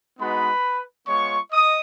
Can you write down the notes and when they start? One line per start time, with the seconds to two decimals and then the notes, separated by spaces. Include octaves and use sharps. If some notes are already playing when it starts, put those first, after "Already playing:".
0.19 G#3 B3 D#4 F#4 B4 B5
1.07 G#3 B3 F4 C#5 C#6
1.51 D#5 D#6